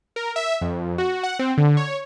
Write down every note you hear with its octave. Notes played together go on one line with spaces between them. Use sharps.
A#4
E5
F2
F#4
F#5
C4
D3
C#5